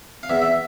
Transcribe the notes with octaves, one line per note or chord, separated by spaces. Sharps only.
F5
E2 E5
E5